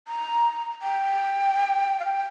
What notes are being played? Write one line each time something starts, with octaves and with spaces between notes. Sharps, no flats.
A#5
G5
F5
G5